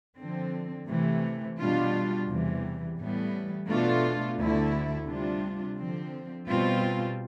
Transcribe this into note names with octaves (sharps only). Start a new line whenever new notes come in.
D3 F3 C4
C3 E3 A3
B2 G3 D4 F4
E2 C3 E3 G3
A2 E3 G3 B3
B2 A3 D4 F4
D2 D3 A3 E4
C3 G3 D4 F4
D3 F3 C4
B2 G3 C4 F4